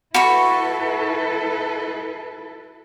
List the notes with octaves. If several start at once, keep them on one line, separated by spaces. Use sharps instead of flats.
E4 F#4 A4 B4 B5 C#6